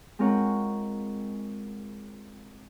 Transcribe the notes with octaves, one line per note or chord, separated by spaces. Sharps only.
G#3 C4 F4 A#4 C#5 F#5